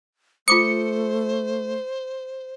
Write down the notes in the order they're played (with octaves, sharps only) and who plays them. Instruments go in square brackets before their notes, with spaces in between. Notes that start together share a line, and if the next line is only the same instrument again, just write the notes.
[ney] A3 [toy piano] F4 D6 D#6 [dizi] C5 [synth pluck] C#7